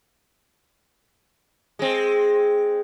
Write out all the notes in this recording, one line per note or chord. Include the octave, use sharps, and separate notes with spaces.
G#3 C4